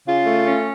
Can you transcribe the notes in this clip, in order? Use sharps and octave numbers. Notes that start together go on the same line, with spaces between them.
C#3 F4
A3
C#4